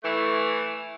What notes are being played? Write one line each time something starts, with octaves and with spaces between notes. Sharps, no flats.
E3 A3